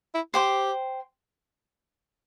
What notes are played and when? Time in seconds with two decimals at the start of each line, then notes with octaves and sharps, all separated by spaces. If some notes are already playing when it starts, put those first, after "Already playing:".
0.14 E4
0.34 G4 C5 G5 C6